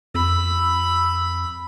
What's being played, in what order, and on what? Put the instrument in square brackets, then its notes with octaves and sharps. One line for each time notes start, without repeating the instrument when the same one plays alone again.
[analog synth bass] F2 [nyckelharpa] B5 [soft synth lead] E6